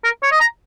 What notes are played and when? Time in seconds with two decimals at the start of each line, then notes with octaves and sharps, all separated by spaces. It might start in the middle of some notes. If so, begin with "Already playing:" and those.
0.04 A#4
0.23 C#5
0.31 D#5
0.40 A#5